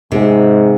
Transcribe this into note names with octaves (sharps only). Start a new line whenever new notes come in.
G#2 C3